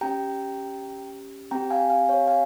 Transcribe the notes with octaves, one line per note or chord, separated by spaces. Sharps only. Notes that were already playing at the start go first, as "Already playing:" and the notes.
C#4 G4 G5 A#5
C4 G4 G5 A#5
F5 G#5
F5 G#5
C#5 F5
F5 G#5